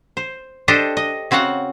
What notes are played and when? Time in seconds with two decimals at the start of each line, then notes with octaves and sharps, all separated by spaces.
0.17 C5
0.68 D4 G4 A4 C5 D#5
0.97 D#5
1.31 C#3 C4 F#4 F5 F#5